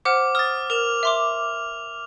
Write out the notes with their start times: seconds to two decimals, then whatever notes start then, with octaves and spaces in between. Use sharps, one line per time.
0.05 C5 F#5 D6 F6
0.35 D#6 F6 A6
0.70 A#4 E7 F7
1.03 E5 C6 D6